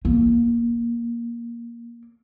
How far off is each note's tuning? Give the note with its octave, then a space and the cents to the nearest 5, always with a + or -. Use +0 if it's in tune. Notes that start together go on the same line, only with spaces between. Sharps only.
A#3 +10